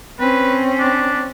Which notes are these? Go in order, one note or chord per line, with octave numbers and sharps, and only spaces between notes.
C4 C#4 B4
D4